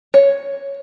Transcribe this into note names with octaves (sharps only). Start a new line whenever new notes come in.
C#5